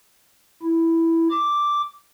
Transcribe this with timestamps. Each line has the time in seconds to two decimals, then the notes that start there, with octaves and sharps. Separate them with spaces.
0.62 E4
1.30 D6